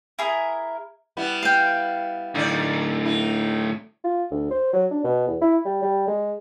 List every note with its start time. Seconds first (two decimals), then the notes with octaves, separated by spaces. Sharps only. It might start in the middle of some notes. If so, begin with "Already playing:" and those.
0.19 E4 G#4 A#4
1.17 G3 B3 E4
1.43 F5 G5
2.35 D2 A2 D#4 D5
3.05 D#4 E4
4.04 F4
4.31 D2
4.51 C5
4.73 F#3
4.91 D4
5.04 B2
5.27 E2
5.41 E4
5.65 G3
5.82 G3
6.07 G#3